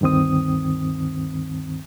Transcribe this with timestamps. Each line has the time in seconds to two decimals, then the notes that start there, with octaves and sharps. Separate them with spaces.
0.01 D2 G2 D#3 C4 D#6